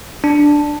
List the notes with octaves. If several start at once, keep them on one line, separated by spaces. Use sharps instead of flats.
D4